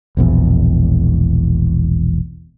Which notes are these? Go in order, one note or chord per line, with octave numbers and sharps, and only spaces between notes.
E1 A#1 E2